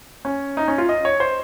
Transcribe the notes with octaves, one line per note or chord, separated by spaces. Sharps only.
C#4
D#4
C#4
F4
D#5
C#5
C5